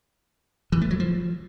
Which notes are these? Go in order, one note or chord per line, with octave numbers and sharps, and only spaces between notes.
E3
A3
F#3
F3